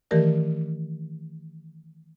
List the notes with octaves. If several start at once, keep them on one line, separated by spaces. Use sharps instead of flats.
D#3 E3 A3 G4 A#4 D5